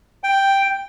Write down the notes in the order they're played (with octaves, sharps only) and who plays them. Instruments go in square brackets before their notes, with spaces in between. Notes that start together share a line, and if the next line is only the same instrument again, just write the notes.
[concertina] G5